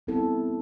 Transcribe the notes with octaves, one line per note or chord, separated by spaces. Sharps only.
G3 B3 C4 E4 A4